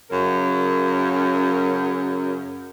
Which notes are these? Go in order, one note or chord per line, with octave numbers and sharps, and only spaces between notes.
F#2 C#3 A#4